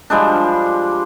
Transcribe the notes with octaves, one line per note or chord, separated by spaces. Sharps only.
F3 G3 G#3 D4